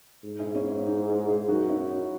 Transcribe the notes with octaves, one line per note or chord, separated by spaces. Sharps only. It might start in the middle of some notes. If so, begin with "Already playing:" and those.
G#2
E4 G#4
C#4 E4
C#4 E4
D#4
E4 G#4
F#2 D#4 F#4
C#4 E4
D#4 F#4